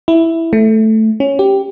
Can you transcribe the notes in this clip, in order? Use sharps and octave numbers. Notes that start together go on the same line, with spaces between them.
E4
A3
C#4
G4